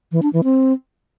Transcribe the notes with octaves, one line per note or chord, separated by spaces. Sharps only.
E3
D4
E3
C4